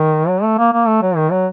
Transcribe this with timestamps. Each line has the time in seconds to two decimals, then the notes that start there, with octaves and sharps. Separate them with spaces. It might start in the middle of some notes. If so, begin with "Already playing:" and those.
Already playing: D#3
0.28 F#3
0.43 A3
0.58 A#3
0.73 A#3
0.87 A3
1.02 F#3
1.16 D#3
1.31 F#3